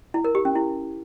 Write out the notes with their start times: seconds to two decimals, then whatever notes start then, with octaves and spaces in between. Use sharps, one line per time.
0.14 E4
0.25 A#4
0.35 G4
0.45 C#4
0.55 E4